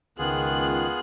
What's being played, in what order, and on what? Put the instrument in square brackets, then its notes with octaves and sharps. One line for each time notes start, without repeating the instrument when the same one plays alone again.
[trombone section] C#2 [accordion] D#3 [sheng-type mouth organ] B3 F4 G#4 [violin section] F#6